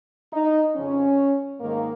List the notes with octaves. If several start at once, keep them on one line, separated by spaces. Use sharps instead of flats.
D#4
F2 C#3 F3 C#4
G#2 D#3 A#3